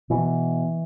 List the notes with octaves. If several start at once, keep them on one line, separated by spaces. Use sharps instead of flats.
B2 E3